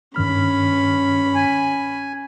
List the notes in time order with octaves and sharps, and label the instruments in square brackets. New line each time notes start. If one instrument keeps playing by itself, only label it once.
[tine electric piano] G2 D#3 F6 [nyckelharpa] C#4 B5
[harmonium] G#5